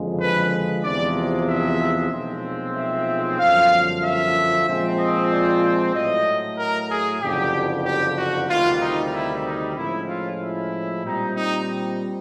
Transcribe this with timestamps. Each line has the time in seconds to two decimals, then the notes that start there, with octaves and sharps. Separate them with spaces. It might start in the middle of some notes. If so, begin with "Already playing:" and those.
Already playing: F#1 F2 D3 F3 G#3
0.20 B4
0.84 E2 C3 F3 G#3 D5
1.47 E5
2.11 B1 A#2 F3 G#3 C4
2.76 E5
3.39 G1 F#2 D3 F3 F5
4.03 E5
4.67 A#2 F3 G#3 C4
4.99 D#5
5.30 D5
5.94 A2 F#3 A3 D#5
6.58 A#4
6.90 G#4
7.22 F#1 F2 D3 G4
7.85 G4
8.17 F#4
8.49 D2 C3 D#3 G3 F4
8.81 D#4
9.13 E4
9.45 D#4
9.77 A2 F3 G#3 C#4 E4
10.08 F4
10.41 E4
11.05 A#2 G3 C4 D#4
11.36 D#4